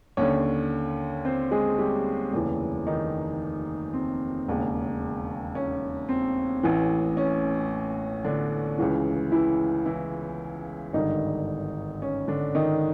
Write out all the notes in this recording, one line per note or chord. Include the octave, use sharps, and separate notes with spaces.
D#2 D3 C#4 C#5
C4 C5
G#3 G#4
G3 G4
F1 D#2 C#3 E3
D#3 D#4
C4
E1 D#2 C#3
C#4
C4
A1 A2 E3
C#4
D3 D4
C#2 C#3 E3
E3 E4
E3 E4
G#1 G2 D3 D#3 D#4
C#4
D3 D4
D#3 D#4